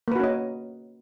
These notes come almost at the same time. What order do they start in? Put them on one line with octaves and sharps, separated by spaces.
A#3 B4 F#4 C#4 D#5